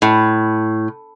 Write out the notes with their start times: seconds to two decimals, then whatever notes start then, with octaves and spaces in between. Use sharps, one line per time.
0.02 A2